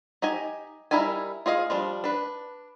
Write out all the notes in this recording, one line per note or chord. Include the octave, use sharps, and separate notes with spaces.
D#4 G4 D#5 G#5
G3 D#4 E4 A#4 G#5
F4 G#4 D#5 F5
F3 G3 D4
D4 B4